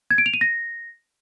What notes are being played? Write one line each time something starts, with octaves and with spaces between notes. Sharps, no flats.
G#6
D7
F7
D#7
A#6